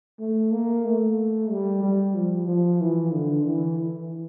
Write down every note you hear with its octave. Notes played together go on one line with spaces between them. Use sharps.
A3
A#3
A3
G3
G3
F3
F3
E3
D3
E3
E3